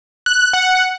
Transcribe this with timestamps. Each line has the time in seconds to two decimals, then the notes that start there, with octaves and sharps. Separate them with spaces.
0.26 F#6
0.53 F#5